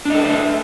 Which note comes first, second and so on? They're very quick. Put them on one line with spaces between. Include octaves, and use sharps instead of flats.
D4 D#5 A4 B4 E5